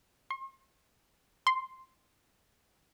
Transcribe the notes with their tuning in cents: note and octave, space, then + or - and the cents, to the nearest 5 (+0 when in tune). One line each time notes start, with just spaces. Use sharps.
C6 +45
C6 +0